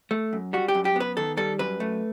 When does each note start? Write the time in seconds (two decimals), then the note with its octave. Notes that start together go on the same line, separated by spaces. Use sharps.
0.11 A3
0.33 F#2
0.53 G3 F#4
0.68 G4
0.74 F#2
0.85 G4
0.96 B3 B4
1.17 D#3 A4
1.37 G3 A4
1.59 F#2 B4
1.80 A3